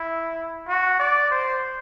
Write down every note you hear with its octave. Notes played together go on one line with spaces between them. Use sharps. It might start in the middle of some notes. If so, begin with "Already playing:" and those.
Already playing: E4
F#4
D5
C5